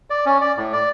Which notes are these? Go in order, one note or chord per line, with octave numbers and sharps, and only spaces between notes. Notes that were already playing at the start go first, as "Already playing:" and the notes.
D5
C#4
D5
A2
D5